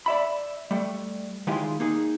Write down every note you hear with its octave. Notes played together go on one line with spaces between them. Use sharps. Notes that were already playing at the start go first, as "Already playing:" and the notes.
D5 E5 B5
G3 A3
D#3 G#3 E4 F4 G4 G#4
A#3 D#4 G#4